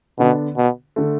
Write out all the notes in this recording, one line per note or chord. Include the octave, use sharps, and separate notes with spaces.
B2 D3 B3 D4
B2
D3 A3